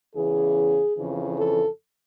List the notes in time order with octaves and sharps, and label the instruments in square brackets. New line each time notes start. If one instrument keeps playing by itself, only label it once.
[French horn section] E2 C#3 E3 G#4
F2 C#3 E3
A4